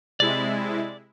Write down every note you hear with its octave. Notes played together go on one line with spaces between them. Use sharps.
C3 G#3 E4 D5